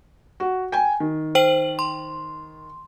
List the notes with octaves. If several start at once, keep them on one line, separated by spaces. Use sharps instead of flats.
F#4
G5 G#5
D#3
C5 G5 F#7
C6